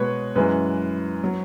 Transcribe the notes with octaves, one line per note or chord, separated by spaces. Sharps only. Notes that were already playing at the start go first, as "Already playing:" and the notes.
Already playing: B2 G#3 B4 C#5
F#2 E3 G#3 B4
F#3